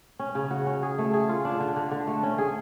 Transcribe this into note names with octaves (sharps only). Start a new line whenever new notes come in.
C#4
C#3
F#4
C#4
G#4
A3
G#4
F4
D4
D3
D3
D3
A3
C#4
G#4